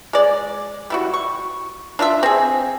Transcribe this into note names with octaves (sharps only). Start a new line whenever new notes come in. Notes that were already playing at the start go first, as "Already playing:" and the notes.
G#3 D5
G3 E4 F#4
C#6
D4 F4 D#5 E5
C4 G#4